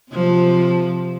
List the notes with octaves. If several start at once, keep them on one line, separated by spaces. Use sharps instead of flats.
C3 F3